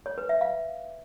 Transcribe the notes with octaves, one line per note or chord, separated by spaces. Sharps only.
C#5
B4
E5
F5